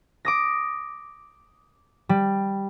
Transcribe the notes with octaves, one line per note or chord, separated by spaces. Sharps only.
D6 D#6 A#6
G3